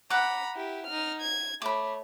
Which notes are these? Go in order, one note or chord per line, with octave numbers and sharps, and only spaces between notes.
F#5 A#5 B5 D6
E4 G4
D#4 F6
G#6
A3 C#5 B5 D6